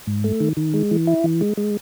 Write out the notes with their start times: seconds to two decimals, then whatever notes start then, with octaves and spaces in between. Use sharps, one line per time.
0.07 G#2
0.24 A3
0.40 D#3
0.57 D#3
0.74 G#3
0.91 E3
1.07 E4
1.24 E3
1.41 G#3
1.57 G#3